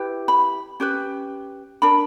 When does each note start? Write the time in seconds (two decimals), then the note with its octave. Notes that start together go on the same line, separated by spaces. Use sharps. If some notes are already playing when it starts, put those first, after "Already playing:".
Already playing: E4 G4 B4
0.28 B5
0.80 C#4 G4 B4
1.82 D4 A#4 B5